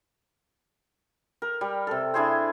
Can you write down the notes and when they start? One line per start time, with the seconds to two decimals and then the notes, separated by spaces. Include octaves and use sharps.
1.42 A#4
1.61 G3
1.87 C3 A4
2.14 D4 E4 G#4 C5